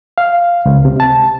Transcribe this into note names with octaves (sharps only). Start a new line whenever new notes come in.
F5
C#2
C3
A5